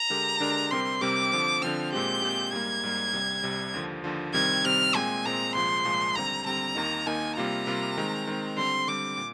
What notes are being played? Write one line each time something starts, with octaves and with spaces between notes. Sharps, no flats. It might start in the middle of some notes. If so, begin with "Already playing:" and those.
Already playing: A#5
D3 G#3 D4 G4 A#4
D3 G#3 D4 G4 A#4
C3 G3 C4 G4 A#4 C6
C3 G3 C4 G4 A#4 D6
D3 F3 C4
D3 F3 C4 F6
A#2 G#3 C4 G4 G6
A#2 G#3 C4 G4
G#2 G3 A#3 G#6
G#2 G3 A#3
C2 C3 G3
C2 C3 G3
D#2 D3 F3
D#2 D3 F3
C3 D#3 G3 C4 G#6
C3 D#3 G3 C4 F6
A#2 G#3 C4 G#5
A#2 G#3 C4 A#5
C2 A#2 F3 G#3 C6
C2 A#2 F3 G#3
D#2 D3 G3 C4 A#5
D#2 D3 G3 C4 A#5
D#2 D#3 A#3 D#4
D#2 D#3 A#3 D#4 G#5
C3 G3 A#3 F4 A#5
C3 G3 A#3 F4
D#3 G#3 C4
D#3 G#3 C4
D3 G3 C4 C6
D3 G3 C4 D6
A#2